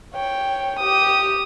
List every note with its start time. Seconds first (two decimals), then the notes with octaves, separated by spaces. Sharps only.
0.14 C#5 G5
0.79 G4 D#6